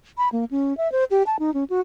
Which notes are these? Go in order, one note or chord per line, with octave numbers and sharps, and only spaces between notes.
B5
A#3
C#4
E5
C5
G4
A5
D#4
C#4
F#4